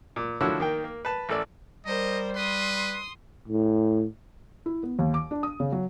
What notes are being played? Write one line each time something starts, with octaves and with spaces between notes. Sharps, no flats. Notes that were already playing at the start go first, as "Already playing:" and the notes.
A#2
D3 F3 E4 F#4 C#5 E6
D#3 A#3 G5
A#3
B4 A5
A1 A4 D5
G3 A#4 C5 D#5
B4 C6 D#6
A2
E4
B3
D#2
D6
D4
D#6
C#3
F#3